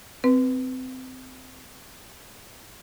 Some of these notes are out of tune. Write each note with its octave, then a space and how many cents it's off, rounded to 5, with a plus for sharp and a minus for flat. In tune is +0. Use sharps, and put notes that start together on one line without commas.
C4 -20 B4 +0